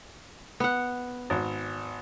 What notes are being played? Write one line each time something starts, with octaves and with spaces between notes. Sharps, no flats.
B3 F#5
G#1